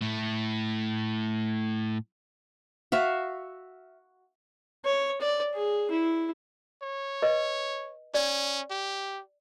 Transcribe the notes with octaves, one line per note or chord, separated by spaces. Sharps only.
A2 A3
F#4 E5 F5
C#5
D5
G#4
E4
C#5
B4 D#5
C#4 D5
G4